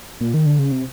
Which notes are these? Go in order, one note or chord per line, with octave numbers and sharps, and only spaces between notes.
A#2
D#3
D3
C#3
C3